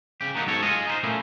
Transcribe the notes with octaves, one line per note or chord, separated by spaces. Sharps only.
C#3 G4
F#3 A#3 B3 D#4
B1 G#2 A4 C#5
F4 G#4 D#5
D#4 E4 C5
A#2 A3 A#3 C#4 E4